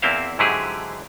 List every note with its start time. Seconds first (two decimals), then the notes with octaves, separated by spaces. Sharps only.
0.02 E2 A#3 C4 E4 C5 F5
0.39 G#2 D3 F#3 E4 G4 G#4